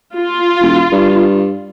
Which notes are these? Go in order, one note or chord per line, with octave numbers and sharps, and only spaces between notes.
F4
E1
G2